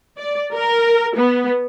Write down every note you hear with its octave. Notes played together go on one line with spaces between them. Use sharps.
D5
A#4
B3